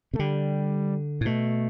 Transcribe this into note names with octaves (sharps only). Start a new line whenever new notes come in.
C3 A3
D3 G3
A2
B2 A3